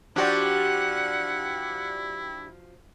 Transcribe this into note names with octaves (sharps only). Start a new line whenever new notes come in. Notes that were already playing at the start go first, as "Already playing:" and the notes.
F3 D4 E4 F#4 G4 D5 F#5